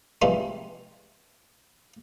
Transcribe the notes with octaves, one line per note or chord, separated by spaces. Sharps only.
E3 F3 G3 G#3 C4 D#4